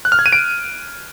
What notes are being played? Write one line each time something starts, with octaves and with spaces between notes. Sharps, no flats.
F#6
F6
G#6
D#7
D7